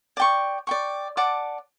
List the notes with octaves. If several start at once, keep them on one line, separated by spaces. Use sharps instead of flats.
D5 G5 C#6
D5 G5 C#6
D5 F#5 A5 D6